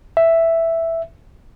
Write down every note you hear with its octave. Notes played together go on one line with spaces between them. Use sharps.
E5